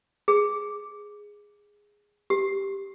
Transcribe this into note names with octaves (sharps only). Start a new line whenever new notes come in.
G#4
G4